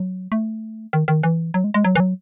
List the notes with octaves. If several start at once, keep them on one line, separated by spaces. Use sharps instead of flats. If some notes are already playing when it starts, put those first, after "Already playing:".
Already playing: F#3
A3
D#3
D#3
E3
F#3
G#3
G#3
F#3
E3
F#3